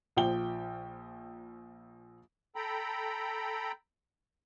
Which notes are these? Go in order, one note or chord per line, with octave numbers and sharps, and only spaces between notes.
A#1 F3 G5 G7
A4 G5 A#5 B5